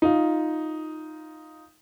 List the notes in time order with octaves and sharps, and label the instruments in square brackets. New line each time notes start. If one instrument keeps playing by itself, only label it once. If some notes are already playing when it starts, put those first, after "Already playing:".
[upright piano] D#4 F4